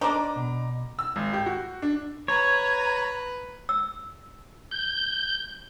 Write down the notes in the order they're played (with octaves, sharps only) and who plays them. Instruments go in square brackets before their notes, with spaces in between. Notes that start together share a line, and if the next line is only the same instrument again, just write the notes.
[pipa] D4 D#4 [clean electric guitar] A#4 C5 [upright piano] A#5 D6
[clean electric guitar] B2
[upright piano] E6
G#1
G4
F#4
D4
[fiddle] B4 [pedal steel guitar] C#5 [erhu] A#5
[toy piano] E6
[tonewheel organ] G6